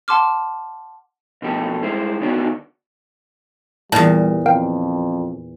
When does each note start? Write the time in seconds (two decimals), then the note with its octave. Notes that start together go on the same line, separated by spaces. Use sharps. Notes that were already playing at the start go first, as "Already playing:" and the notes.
0.08 F#5 A5 C6 D6 F6
1.42 B2 F3 G4 A4
1.82 G3 G#3 E4 C5
2.21 D3 D#3 B3 D4 F#4 D5
3.92 E2 A#2 G3 A5
4.46 F2 A#4 F5 G5